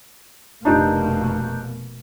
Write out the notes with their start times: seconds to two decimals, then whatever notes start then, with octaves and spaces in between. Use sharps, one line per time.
0.65 F1 B2 A#3 D4 D#4 G4